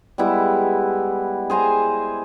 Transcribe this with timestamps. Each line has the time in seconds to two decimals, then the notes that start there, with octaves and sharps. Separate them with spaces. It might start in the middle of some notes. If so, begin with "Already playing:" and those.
0.18 G3 G#3 B3 E4
1.50 G#4 C5 G#5 A#5